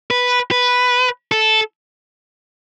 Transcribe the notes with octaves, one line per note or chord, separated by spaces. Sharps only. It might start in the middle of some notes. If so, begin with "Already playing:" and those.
B4
B4
A4